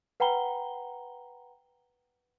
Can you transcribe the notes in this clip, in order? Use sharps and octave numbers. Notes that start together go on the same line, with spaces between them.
B4 F#5 G5 A#5 B5 G7